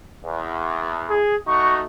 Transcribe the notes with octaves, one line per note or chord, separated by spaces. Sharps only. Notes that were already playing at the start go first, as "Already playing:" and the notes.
E2
G#4
A3 D#4 F#4 C#6